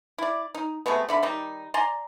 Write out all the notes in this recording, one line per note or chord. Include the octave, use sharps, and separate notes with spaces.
E4 D5
D#4
C3 G#3 A3 B3
D3 E5 B5
D#3 G3 D#4
D5 G#5 A#5 C6